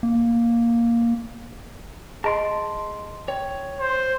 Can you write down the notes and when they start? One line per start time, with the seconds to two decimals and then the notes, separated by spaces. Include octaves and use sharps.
0.03 A#3
2.24 G#4 D#5 A5 A#5 C6 D7
3.28 C#5 G5
3.80 C5